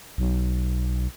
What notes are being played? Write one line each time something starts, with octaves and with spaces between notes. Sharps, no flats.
B1